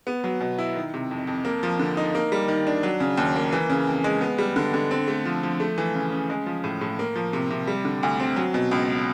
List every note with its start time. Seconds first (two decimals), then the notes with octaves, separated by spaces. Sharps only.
0.07 B3
0.24 F#3
0.41 B2
0.58 E4
0.75 D#3
0.94 C3
1.11 F2
1.27 F2
1.45 A#3
1.63 F3
1.79 D3
1.97 D#4
2.15 A#3
2.32 G3
2.48 D#3
2.67 D4
2.83 F#3
3.00 C#3
3.17 D#2
3.36 A#3
3.53 E3
3.70 C#3
3.87 F2
4.04 G#3
4.21 B3
4.38 G3
4.56 D3
4.74 D3
4.91 C4
5.08 A3
5.25 F3
5.43 F3
5.60 A3
5.78 E3
5.94 C#3
6.12 C#3
6.30 G#3
6.46 F3
6.64 A2
6.81 A2
6.99 A#3
7.16 F3
7.33 C3
7.51 C3
7.67 G3
7.85 D3
8.03 D2
8.20 C4
8.36 F#3
8.54 B2
8.71 C#2